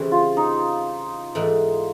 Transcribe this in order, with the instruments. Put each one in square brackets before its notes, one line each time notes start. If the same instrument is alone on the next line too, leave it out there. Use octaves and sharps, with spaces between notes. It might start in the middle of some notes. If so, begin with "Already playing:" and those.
Already playing: [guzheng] C#3 E3 G3 C4
[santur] F4
D#4
[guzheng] G#2 E3 A3